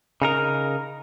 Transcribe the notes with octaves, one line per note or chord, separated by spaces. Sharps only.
C#3 D#4 A#4